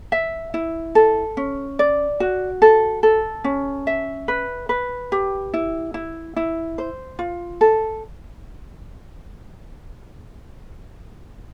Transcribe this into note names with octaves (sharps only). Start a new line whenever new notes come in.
E5
E4
A4
C#4
D5
F#4
A4
A4
C#4
E5
B4
B4
G4
E4
E4
E4
C5
F4
A4